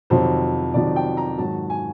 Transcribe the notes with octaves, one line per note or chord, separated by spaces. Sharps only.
F2 C3 D#3 F#3 C5
F2 C3 D#3 F#3 D5
G5
A#5
G#2 D#3 F#3 A5
G#5